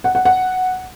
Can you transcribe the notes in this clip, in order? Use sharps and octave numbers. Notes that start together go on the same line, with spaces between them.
F#5
F#5
F#5